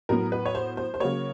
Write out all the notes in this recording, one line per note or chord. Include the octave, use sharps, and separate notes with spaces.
A2 F#3 B3 A#4
B4
C#5
C5
C5
C5
C#3 F#3 A#3 C#5